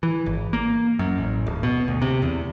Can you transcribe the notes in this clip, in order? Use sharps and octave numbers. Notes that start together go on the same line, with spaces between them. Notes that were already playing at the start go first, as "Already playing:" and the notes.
E3
G#1
A#3
F#2
A1
D1
B2
D2
C3
E2